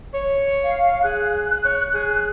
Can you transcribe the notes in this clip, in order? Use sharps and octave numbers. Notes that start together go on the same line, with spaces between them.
C#5
F5
G#4 F#6
C#5
G#4